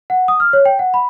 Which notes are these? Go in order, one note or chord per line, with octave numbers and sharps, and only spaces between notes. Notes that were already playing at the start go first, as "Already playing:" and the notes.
F#5
D#6
F6
C#5
G5
F#5
B5